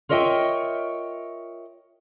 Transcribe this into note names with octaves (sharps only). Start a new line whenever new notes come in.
F4 A#4 C#5 D#5 E5 G5